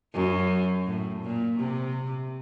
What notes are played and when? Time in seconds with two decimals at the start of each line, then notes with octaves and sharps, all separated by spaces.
0.14 F#2
0.86 A2
1.23 A#2
1.59 C3